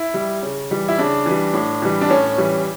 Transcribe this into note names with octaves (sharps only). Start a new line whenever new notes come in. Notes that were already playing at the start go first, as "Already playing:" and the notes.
Already playing: E4
G3
C#3
E3 G3
E4
C#3 D4
E3 G3
A2
E3 G3
D4
A2 C#4
E3 G3